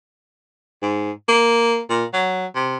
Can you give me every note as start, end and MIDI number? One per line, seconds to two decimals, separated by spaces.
0.82 1.11 44
1.28 1.80 58
1.90 2.05 46
2.13 2.46 54
2.55 2.77 48